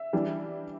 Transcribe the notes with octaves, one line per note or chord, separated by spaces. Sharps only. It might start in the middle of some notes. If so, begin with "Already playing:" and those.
Already playing: E5
E3 G3 D4